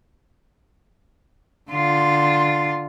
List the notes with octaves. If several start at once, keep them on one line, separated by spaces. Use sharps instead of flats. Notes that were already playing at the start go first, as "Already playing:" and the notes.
D3 F4